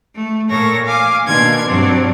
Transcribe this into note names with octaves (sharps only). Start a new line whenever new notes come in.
A3
A#2 A#3 A4 C#5 A#6
F5 G#5 D6
B2 D#3 A#3 D4 C6 G#6
G2 F#3 C4 D4